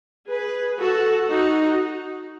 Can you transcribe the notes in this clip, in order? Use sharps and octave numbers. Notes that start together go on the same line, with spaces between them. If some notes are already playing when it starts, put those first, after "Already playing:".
G#4 B4
F#4 A4
D#4 F#4